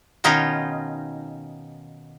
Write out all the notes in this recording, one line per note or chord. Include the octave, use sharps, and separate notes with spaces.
B2 D#3 C#4 D#4 F4